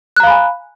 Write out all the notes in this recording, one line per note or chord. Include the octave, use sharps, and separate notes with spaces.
F5 G#5 A#5 B5 F#6